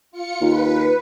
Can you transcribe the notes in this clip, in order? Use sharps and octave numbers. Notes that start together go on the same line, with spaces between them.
F4 C#7
D#2 B4